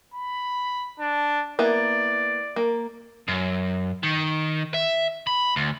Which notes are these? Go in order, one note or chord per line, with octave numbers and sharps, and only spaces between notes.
B5
D4
A#3 B3 E4 D5
A#3
F#2
D#3
E5
B5
D2